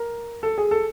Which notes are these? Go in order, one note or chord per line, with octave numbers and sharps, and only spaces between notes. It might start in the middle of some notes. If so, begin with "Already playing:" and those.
Already playing: A#4
A4
G#4
A4